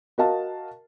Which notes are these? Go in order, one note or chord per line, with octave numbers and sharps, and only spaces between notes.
F#4 A#4 D#5 F5 A5